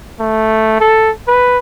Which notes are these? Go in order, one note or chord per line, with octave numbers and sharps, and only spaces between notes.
A3
A4
B4